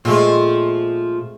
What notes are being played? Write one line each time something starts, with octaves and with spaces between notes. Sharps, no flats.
A#2 F3 G#3 A3 C4 F4